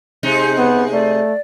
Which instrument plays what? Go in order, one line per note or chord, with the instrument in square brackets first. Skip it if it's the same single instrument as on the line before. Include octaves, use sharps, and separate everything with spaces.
[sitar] C3 G#3 D#4
[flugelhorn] B3
[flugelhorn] A3 [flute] D5